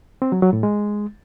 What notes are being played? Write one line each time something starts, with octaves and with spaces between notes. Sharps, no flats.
C4
F#3
F#3
A2
G#3